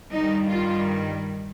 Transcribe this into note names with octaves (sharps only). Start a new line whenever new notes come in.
G2 D#3 G3 D#4
F4